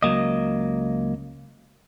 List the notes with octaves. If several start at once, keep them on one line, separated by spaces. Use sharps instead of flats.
C#2 F#3 A#3 D#5